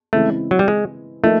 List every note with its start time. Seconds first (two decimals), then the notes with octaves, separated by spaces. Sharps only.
0.13 C#3 E3 G#3 A3 C4 E4
0.51 F#3
0.59 G3
0.68 G#3
1.23 F3 A3 A#3 D#4